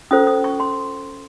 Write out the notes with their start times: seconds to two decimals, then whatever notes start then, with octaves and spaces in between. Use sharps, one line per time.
0.11 C#4 F4 A4 C5 D#6
0.27 D#6
0.44 C#6
0.60 C6